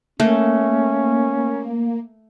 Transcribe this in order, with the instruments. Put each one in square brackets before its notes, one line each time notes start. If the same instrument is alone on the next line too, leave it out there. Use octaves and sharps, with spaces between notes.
[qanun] A3 [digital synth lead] A#3 [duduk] C#4